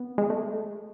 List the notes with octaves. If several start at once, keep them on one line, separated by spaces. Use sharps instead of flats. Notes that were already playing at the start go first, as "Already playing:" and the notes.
Already playing: B3
G#3
A3